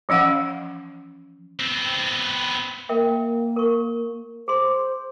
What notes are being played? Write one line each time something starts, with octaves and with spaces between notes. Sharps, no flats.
E3 F3 C#4 F5 F#5
B3 C4
A#3 A#4 E5 G5
A#4 C#6
G#4 C5 C6